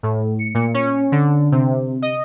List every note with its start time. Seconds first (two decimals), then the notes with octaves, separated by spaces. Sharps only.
0.03 A2
0.39 C#7
0.54 A#2
0.74 C#4
1.12 D3
1.52 C3
2.02 D#5